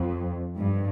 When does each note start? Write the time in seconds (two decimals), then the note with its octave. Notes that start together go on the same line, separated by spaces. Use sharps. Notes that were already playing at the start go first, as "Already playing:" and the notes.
Already playing: F2
0.57 G2